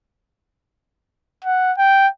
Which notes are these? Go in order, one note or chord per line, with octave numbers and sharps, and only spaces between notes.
F#5
G5